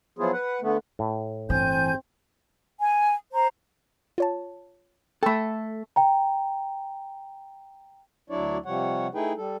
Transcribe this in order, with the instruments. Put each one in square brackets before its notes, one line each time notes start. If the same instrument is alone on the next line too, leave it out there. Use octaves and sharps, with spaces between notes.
[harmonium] F3 F#3 B3 E4 F4 G#4
B4 F#5
D3 A3 B3
[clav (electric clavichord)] A2
[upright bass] G1 E3 [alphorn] C4 [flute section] G#5 G6
[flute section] G#5
C5 A#5
[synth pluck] F4 C#5 A5
[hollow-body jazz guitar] A3 A4 [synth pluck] G5 B5
[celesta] G5 A#5
[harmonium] D2 F#3 D4 E4 C#5 D5
C3 F3 G3 C#5 F#5
A3 D#4 E4 G#4 B4 G5
G3 A4